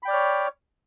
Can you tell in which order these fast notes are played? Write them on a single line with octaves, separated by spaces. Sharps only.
B5 G5 D5 F6 C#5